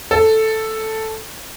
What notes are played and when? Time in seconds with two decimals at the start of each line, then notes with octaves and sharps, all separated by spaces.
0.11 A4